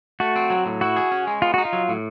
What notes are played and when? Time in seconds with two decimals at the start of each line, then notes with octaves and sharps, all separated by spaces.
0.20 A3 F#4
0.36 C4
0.50 F#3
0.66 A2
0.81 E4 F#4
0.96 G#4
1.12 C#4
1.27 G#3
1.42 B3 F4
1.54 D#4 F#4
1.65 F4
1.73 F#3
1.89 A2